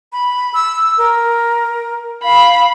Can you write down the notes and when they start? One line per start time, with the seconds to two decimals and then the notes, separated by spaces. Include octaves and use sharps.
0.13 B5
0.54 E6
0.98 A#4
2.24 F5 B5